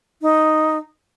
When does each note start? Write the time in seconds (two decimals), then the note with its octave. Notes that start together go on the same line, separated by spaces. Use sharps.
0.22 D#4